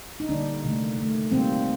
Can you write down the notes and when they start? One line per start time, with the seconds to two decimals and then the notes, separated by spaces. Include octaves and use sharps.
0.20 D#4
0.29 D3 G3 A#3 D4
0.64 C3 D#3 A3
0.98 D#3 A3
1.31 D#3 G3 A#3 C4